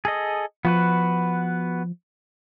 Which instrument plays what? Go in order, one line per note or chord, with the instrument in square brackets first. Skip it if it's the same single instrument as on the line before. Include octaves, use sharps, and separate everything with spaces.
[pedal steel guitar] G#4 A4 D#5
[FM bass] F3 [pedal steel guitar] B3 F#4 B4